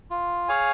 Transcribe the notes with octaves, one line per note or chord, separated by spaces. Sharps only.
F4
G#4 C#5 F5 G#5